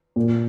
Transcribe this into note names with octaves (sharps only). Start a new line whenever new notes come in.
A#2